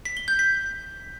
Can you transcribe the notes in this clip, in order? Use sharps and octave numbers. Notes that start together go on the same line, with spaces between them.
B6
G7
G6
B6